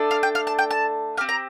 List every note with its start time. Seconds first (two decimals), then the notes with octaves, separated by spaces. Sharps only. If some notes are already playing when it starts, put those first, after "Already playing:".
Already playing: A3 D4 A4
0.11 F5
0.23 G5
0.35 F5
0.47 A5
0.59 G5
0.71 A5
1.17 C4 G4 F5
1.29 A#5